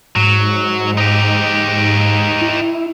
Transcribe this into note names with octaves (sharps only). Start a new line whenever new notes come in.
G#2 F#3
D#4 G4
E4